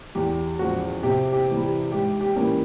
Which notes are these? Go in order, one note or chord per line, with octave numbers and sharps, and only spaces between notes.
E2 G4
C#3 F3 G#3 F#4
C3 G4
G4
E3 G3
G4
G#2 G4
G4
E3 G3 A#3 C#4